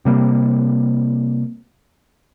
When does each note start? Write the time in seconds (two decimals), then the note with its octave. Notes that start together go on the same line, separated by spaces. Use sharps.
0.05 C3 G3 A#3